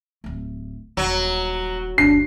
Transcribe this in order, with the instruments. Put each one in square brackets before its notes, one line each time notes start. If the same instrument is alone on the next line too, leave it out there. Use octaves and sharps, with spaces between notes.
[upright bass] D1 A3
[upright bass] D#1 [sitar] F#3
[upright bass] F#1 D2 [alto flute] D4 [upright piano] C7